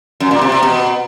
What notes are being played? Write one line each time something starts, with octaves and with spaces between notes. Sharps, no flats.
F#2
A#2
C3
C3
B2